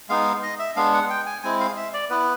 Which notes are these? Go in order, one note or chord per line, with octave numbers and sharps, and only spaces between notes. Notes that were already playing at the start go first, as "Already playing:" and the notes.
G#3 B3 D#4 F5
D#5
E5
G#3 B3 D4 F5
F#5
G5
G#5
G#3 C4 E4 G#5
F5
E5
D5
B3 E4 B4